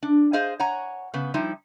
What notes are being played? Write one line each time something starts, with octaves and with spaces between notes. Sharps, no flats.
D4
G#4 C5 D#5 F5
C#5 F#5 G#5 A#5
C#3 B3
F3 G3 D#4 E4